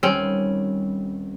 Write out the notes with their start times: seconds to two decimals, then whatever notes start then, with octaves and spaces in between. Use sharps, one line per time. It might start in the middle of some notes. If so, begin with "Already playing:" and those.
0.03 D#1 G3 C4 C#4